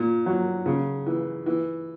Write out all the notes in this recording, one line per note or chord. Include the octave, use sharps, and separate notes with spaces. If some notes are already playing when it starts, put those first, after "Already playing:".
Already playing: A#2
F#3
C#3
E3
E3